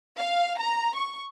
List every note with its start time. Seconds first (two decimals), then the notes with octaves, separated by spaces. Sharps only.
0.17 F5
0.60 A#5
0.95 C#6